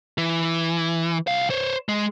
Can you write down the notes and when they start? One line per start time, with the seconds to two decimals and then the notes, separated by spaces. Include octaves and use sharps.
0.18 E3
1.27 C2 F5
1.50 C5 C#5
1.89 G#3